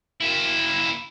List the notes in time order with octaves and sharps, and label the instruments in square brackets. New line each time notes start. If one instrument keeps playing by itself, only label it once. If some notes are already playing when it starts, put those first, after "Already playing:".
[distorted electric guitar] A#3 E4